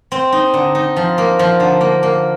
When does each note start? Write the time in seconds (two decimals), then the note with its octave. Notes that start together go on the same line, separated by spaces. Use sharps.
0.12 C4
0.32 D#4
0.54 D3
0.75 D#4
0.97 F3
1.18 A#3
1.39 F3
1.60 D3
1.81 A#3
2.03 A#3